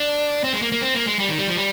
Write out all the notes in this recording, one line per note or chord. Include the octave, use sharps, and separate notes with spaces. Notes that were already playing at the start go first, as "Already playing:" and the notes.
Already playing: D4
C4
G#3
A#3
A#3
C4
A#3
G#3
G3
D#3
G3
F3
G3